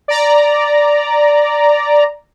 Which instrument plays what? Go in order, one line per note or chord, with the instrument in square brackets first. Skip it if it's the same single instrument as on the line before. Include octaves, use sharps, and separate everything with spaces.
[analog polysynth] D5 A#5